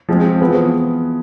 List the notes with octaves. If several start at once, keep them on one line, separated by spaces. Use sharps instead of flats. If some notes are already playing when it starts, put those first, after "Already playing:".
F3 G#3 C4
E3 B3 F4 G#4 B4